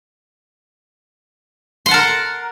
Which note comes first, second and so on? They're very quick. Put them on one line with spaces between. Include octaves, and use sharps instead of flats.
C6 F#5 A5 A#4